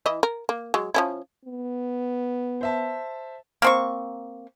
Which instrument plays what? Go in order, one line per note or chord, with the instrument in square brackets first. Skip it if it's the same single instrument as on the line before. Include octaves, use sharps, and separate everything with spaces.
[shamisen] E3 E4 D#5
A#4
A#3
F#3 G#3
F3 C#4 E4
[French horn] B3
[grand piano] C5 E5 A5
[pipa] A#3 C4 C#6